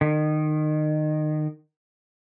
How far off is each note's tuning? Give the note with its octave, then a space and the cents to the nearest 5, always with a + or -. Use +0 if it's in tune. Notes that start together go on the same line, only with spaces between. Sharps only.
D#3 -25